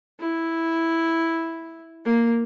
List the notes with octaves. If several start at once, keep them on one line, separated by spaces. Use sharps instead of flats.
E4
A#3